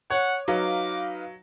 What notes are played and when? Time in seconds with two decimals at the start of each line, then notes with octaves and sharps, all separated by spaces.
0.10 C#5 F#5
0.48 F#3 D#4 B4 F5 D6